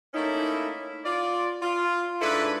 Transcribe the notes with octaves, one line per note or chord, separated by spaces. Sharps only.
A3 A#3 C#4 D#4 E4
F4 D5
F4
G#2 D4 E4 A4 B4